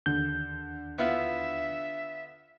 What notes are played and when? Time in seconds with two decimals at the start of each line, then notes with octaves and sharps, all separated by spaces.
0.06 D#2 D3 G6
0.98 B3 E4 F4 E5